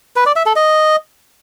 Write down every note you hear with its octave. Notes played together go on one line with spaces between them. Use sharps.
B4
D5
E5
A4
D#5